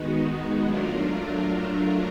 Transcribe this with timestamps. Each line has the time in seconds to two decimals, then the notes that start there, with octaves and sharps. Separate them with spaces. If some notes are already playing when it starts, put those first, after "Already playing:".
Already playing: D#3 G#3 B3 D#4 F#4
0.65 F#3 A3 D4 F4 A#4